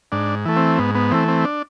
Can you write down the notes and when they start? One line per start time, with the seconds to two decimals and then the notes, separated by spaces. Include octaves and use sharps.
0.12 G#2 D4
0.45 E3 A3
0.57 C4
0.79 G#2 B3
0.95 B3
1.11 E3 A3 C4
1.28 C4
1.45 D4